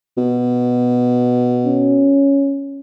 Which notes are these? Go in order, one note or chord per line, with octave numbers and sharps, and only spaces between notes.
B2
C#4